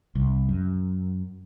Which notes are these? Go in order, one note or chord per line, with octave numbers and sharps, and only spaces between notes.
C2
F#2